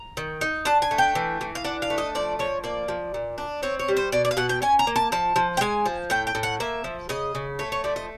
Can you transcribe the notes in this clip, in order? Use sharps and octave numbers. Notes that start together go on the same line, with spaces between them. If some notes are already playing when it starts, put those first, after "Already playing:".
Already playing: A#5
D#3
D#4
D4 A5
G#5
A3
G5
E3
E3
F5
D4 F#5
F5
A3
D#5
F3 D5
F3 C#5
A#3 D5
F3
A#2
D4
C4 C#5
C#5
G3
C5
B2 D5
D5
F5
B2 F#5
G5
C#4 G#5
A#5
A#3
A5
F3 A5
F3
G5
G#3 G#5
F3
A2 G5
G5
A2
F#5
A#3 E5
F3
C#3 D#5
C#3
A3 C#5
C#5
F3 D5
D#5